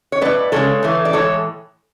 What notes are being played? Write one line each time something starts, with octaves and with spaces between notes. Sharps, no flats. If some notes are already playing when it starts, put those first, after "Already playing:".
C#5
A2 G#3 B4 D5
C#3 E3 G#3 A4 C#5
A2 E3 A3
D5
A2 E3 G#3 A4 C#5